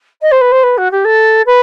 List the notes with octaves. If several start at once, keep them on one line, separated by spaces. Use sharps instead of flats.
D#5
C5
B4
C5
B4
F#4
G4
A4
B4